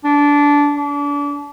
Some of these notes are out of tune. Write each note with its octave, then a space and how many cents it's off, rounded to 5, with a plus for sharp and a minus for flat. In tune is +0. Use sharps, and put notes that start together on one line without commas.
D4 -15
D4 -30